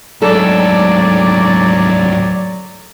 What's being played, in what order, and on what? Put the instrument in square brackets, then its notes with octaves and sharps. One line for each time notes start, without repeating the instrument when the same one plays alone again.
[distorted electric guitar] D2 G#2 [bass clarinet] F#3 [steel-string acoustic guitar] A4 [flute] D5